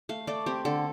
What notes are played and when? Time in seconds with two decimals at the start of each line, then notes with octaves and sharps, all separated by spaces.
0.09 A3 F5
0.27 A3 D5
0.46 C4 G4
0.65 D3 A4